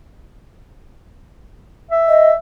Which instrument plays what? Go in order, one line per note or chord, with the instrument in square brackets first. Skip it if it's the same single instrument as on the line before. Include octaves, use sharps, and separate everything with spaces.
[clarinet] E5
[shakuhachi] D#5